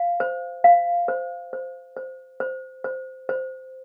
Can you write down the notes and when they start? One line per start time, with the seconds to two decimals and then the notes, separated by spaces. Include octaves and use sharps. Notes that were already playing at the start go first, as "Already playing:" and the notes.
Already playing: F5
0.20 C5
0.64 F5
1.08 C5
1.53 C5
1.97 C5
2.40 C5
2.84 C5
3.29 C5